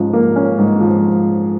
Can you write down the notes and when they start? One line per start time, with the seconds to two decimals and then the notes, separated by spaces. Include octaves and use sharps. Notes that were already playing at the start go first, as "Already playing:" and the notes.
Already playing: G#2 F3 C#4
0.13 A#3
0.36 C#4
0.58 G#2
0.81 F3